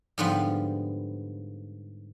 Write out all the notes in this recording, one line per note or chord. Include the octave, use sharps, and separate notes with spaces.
G#2 D3 F3 G3 B3 F4